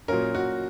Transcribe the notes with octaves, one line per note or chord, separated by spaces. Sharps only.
A#2 F#3 A#3 C#4 A#4
F#4